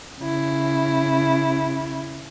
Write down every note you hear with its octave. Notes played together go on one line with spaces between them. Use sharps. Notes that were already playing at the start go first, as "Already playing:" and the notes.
C#3 E4